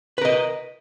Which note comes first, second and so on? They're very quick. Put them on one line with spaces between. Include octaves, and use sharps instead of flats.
B4 A#4 D#5